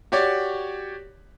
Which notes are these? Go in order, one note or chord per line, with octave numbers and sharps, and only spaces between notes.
F#4 G4 C#5 D5